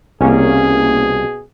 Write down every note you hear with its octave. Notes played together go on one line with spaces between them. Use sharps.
C2 B2 A#3 C#4 G#4